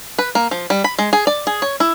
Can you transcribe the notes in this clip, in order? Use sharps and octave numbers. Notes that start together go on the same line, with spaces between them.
B4
A#3
F3
G3
B5
G#3
G#4
D5
G#4
C#5
E4